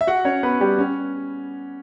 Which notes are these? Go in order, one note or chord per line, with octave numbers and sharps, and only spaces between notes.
E5
F#4 F#5
C#4 C#5
B3 B4
G3 G4
C#4